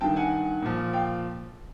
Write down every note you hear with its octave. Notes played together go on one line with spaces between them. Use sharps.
G2 D#3 G5 A5
F#5 G#5
A#2 F3
F5 G5